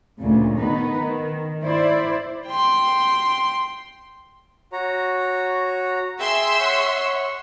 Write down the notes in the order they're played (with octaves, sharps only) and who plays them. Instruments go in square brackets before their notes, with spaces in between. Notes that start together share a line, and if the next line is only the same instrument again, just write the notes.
[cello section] D2 A#2 C#3
D#3 B3 D#4 B4
D#3
E4 C5 D5
[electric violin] G5 C6
[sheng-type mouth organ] F#4 C#5 A#5
[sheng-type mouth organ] G#4 G5 [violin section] E5 C6 E6
[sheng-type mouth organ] C#5 F#5 C#6